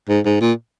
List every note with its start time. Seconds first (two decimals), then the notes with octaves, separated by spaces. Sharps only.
0.09 G#2
0.25 G#2
0.41 A#2